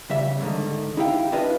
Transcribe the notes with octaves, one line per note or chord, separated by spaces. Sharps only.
C#3 G3 E5
G#2 D3 D#3
D#4 E4 G4 F5 G5
C#4 D4 E4 F4 B4 D#5